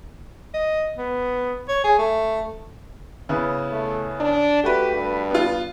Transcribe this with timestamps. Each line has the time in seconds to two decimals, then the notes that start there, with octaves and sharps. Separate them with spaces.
0.54 D#5
0.97 B3
1.69 C#5
1.84 G#4
1.99 A3
3.29 C#3 B3 E4
3.72 A3
4.20 D4
4.64 A3 F#4 G4 B4
4.92 G2
5.31 B3 F4